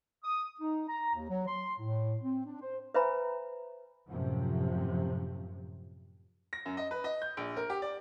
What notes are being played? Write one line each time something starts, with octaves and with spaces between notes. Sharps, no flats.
D#6
D#4
A#5
D#2
F#3
C6
A2
C4
D4
C5
B4 C5 E5 G#5 A#5 B5
F#2 A2 C3 F3
A#6
F#2
D#5
B4
D#5
G6
A#1
A#4
G4
D5